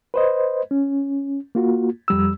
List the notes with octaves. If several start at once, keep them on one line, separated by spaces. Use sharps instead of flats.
B4 C5 D#5
C#4
A#3 F4 F#4
F2 G3 E6